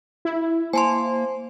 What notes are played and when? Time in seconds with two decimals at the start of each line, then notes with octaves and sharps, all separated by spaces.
0.25 E4
0.73 A#3 C5 G#5 A5 C6